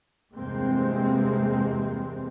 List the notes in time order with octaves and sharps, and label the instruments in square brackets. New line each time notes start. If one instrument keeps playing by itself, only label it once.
[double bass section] E2 G2 C3 G#3 A#3 C4